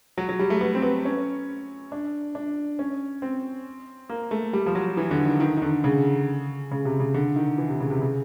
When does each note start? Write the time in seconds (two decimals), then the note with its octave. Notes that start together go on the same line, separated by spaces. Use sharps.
0.18 F#3
0.29 F#3
0.39 G3
0.50 A3
0.61 B3
0.75 C4
0.82 B3
1.05 C#4
1.92 D4
2.35 D4
2.79 C#4
3.22 C4
4.09 A#3
4.31 A3
4.53 G3
4.66 F3
4.75 F#3
4.97 E3
5.11 D3
5.25 D#3
5.40 D#3
5.57 D#3
5.62 D3
5.84 C#3
6.71 C#3
6.85 C3
7.00 C#3
7.14 D3
7.36 D#3
7.58 E3
7.69 C3
7.80 C#3
7.90 C3
8.02 C#3